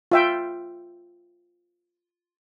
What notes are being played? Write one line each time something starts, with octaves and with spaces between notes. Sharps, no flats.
F4 E5 G5